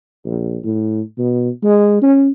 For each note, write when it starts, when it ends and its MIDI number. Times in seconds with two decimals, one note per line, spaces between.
0.25 0.57 34
0.64 1.01 45
1.18 1.49 47
1.63 1.97 56
2.01 2.30 61